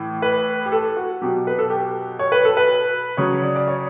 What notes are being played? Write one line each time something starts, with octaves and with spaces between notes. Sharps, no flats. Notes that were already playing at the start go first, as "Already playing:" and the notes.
Already playing: A2 E3
B4
G4
A4
F#4
B2 F#3 G4
B4
A4
G4
C#5
B4
A4
B4
C#3 F#3 C#5
D5
D5
C#5